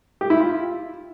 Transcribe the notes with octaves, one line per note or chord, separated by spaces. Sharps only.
G4
E4
F4